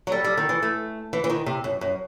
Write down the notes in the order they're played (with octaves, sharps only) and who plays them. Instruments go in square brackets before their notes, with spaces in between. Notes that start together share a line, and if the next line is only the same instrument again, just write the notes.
[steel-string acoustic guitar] F#3
[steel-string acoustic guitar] G3 [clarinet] A4
[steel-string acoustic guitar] G3
D#3
E3
A3
E3
E3
D#3
C3
F#2
F#2